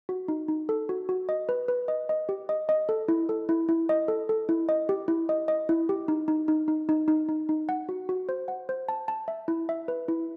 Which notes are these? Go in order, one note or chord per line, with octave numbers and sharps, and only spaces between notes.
F#4
D#4
D#4
A4
F#4
F#4
D#5
B4
B4
D#5
D#5
G4
D#5
D#5
A4
E4
A4
E4
E4
D#5
A4
A4
E4
D#5
G4
E4
D#5
D#5
E4
G4
D#4
D#4
D#4
D#4
D#4
D#4
D#4
D#4
F#5
F#4
F#4
C5
F#5
C5
A5
A5
E5
E4
E5
B4
E4